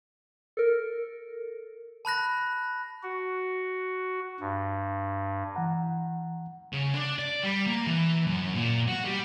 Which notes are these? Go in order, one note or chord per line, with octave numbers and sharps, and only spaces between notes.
A4 A#4
A5 B5 F#6 A#6
F#4
G2
E3 F#5 A#5
C#3
D4
D5
G3
A#3
E3
F#2
A#2
F#4
G3